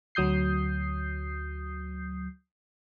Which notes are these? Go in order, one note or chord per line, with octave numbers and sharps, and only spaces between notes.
D2 F#3 D#6 G6 C7